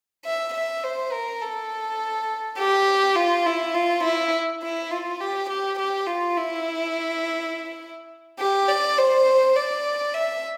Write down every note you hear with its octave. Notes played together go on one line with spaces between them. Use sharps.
E5
E5
C5
A#4
A4
G4
F4
E4
F4
E4
E4
F4
G4
G4
G4
F4
E4
G4
D5
C5
D5
E5